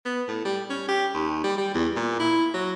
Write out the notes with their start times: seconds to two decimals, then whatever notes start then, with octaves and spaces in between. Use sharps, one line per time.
0.06 B3
0.28 A2
0.45 G3
0.70 C#4
0.88 G4
1.14 D#2
1.44 G3
1.58 G3
1.75 E2
1.96 A#2
2.20 E4
2.54 F#3